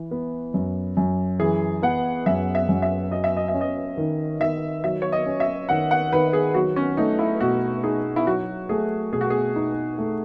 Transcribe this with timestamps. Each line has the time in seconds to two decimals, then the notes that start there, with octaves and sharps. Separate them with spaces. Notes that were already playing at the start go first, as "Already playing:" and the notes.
Already playing: E3
0.11 B3
0.54 F#2
0.97 F#2
1.39 E3 G#4
1.82 B3 F#5
2.26 F#2 E5
2.55 E5
2.69 F#2
2.82 E5
3.11 F#3 D#5
3.24 E5
3.37 D#5
3.48 E5
3.54 C#4
3.61 D#5
3.97 D#3
4.40 D#3 E5
4.84 F#3 E5
5.02 C#5
5.12 D#5
5.26 C#4
5.40 E5
5.69 D#3 F#5
5.91 F#5
6.12 D#3 B4
6.33 G#4
6.54 F#3 F#4
6.76 C#4
6.97 A3 D#4
7.19 E4
7.40 B2 F#4
7.84 D#4 G#4
8.16 E4
8.27 F#3 F#4
8.69 A3 G#4
9.12 B2 G#4
9.21 F#4
9.30 G#4
9.56 D#4
9.98 A3